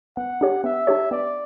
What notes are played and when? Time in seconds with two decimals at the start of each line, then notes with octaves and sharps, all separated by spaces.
0.17 B3 F#5
0.41 D4 G4 C#5
0.64 B3 E5
0.87 D4 G4 C#5
1.11 B3 D5